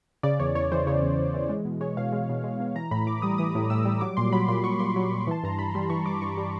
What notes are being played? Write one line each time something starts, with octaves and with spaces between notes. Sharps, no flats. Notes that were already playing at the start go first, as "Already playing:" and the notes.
C#3 D5
E2 C#5
E2 C#5
E3 C5
C#3 C#5
E2
E2
E3
G#3
B2
G#3 C#5
B2 F5
G#3
B2
G#3
B2
E3 A#5
A2 B5
A2 D6
G3 D#6
E3 D#6
A2
A2 E6
G3
F#3 D6
A#2 C6
F#3 B5
A#2 C6
F#3 C#6
A#2 C6
F#3
A#2
E3 A5
G2 A#5
G2 B5
G3 C6
E3 C#6
G2 D6
G2 C#6
G3